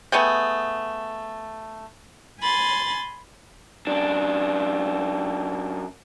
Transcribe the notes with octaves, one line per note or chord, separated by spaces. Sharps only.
A3 B3 G#4 G5
G#5 B5 C6 A6
F#2 D4